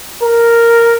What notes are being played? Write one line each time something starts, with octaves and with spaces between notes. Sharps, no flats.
A#4